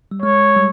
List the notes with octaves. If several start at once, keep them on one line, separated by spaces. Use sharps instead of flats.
G3
G#3 C#5
G3